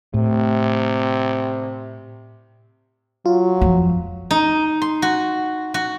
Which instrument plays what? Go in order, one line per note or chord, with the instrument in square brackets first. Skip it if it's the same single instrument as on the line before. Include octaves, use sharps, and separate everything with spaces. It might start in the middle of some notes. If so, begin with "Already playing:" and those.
[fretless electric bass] A2 [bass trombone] C3
[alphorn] F#3 [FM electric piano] F4
[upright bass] F2
[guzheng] D#4
C6
F#4
F#4